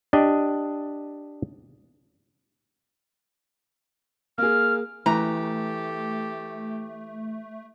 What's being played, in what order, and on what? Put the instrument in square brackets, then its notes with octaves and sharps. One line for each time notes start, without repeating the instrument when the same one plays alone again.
[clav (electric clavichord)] D4 G4 D#5
[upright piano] A#3 G#4 [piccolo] F6
[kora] E3 [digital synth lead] A3 [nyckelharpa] G4 A4 [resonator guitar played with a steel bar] A#5